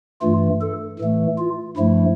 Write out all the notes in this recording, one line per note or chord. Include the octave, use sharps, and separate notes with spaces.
G2 E3 A3 F4
A4
A2 E3 A3
F4
G2 F3 A3 E4